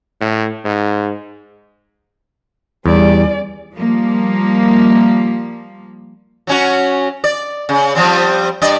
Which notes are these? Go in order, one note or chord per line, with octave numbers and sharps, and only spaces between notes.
A2
G#2
E2 G3 C#4 D5
F3 G3 A#3
F#3 C#4 F#4
D5
C#3
F3 G3 C4
G2 D5 D#5